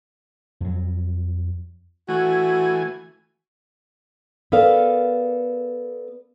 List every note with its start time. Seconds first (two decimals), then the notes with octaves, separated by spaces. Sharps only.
0.61 F2 F#3
2.09 E3 A3 F#4 G#5
4.52 B3 A4 A#4 D5 F5